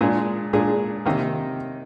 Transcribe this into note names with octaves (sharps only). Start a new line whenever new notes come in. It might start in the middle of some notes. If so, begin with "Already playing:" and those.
A#2 G#3 D4 G#4
A#2 G#3 D4 G#4
C3 D#3 A#3